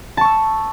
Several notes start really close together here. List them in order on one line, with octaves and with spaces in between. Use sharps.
A5 C#6 E6